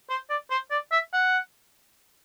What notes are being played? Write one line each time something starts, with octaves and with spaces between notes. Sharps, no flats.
C5
D5
C5
D5
E5
F#5